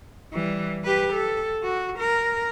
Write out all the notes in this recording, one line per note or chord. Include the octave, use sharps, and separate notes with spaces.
E3 G3
G4 B4
A4
F#4
A#4